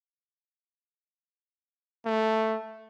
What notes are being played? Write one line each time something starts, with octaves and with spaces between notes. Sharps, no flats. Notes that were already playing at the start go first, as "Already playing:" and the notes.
A3